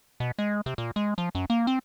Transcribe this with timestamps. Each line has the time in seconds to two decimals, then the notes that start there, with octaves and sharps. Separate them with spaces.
0.20 B2
0.39 G#3
0.66 C3
0.78 A#2
0.96 G#3
1.18 F3
1.35 F#2
1.50 A#3
1.67 C4